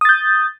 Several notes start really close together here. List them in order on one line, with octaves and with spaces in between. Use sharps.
D#6 A6 G6